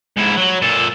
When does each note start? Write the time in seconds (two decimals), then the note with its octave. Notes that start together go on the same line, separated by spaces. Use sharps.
0.17 G#2 E4
0.37 F#3
0.62 A#2 A4